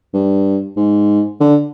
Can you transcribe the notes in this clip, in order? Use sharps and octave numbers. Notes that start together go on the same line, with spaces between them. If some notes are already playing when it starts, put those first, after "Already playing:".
G2
G#2
D3